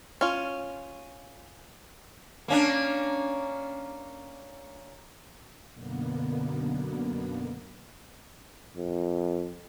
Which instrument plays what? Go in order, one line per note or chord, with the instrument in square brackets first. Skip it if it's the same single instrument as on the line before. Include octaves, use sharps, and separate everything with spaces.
[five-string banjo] C#4 F4
[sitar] A#3 C#4 D4
[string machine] F#2 B2 D3 A#3 B3
[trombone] F2